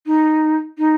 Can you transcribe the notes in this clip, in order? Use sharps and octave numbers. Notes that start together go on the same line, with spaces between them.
D#4
D#4